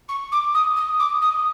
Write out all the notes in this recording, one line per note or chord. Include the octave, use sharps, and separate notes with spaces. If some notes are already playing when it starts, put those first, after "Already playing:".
C#6
D6
D#6
D#6
D6
D#6